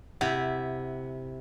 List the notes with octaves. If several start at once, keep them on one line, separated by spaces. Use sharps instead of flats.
C3 E4 F#5